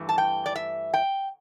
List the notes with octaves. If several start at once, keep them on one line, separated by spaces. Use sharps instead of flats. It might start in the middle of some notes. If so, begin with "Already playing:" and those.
Already playing: G2 E3 A3
A5
G5
D5
E5
G5